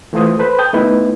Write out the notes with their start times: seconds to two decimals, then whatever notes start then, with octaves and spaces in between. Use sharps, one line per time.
0.13 E3 A3 F4 C5 D#6
0.39 A4 B4 C5 B5
0.59 G5 A5 D#6 G6
0.73 A3 B3 D#4 E4 B4